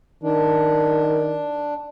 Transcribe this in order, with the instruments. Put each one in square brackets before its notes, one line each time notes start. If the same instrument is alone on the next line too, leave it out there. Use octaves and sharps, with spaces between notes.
[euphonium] D#3 [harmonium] D4